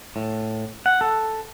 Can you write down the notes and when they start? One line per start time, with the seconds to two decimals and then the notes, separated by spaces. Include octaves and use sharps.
0.16 A2
0.86 F#5
1.01 A4